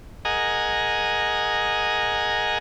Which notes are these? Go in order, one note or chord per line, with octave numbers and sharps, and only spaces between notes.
G#4 A#4 D#5 F#5 G#5 A#5